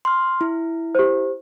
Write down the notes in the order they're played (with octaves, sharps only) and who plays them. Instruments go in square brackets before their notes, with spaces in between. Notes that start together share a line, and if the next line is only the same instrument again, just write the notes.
[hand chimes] C6 F6
E4
[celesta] G4 C5